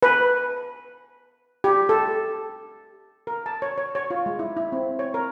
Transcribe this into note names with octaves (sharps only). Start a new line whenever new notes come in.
B4
G4
A4
A#4
A5
C#5
C#5
C#5
F4
G#3
E4
E4
C4
C#5
A#4